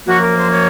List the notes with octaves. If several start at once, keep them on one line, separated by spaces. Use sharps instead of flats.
F#2 F3 A#3 F#4
A#4
C5
C#5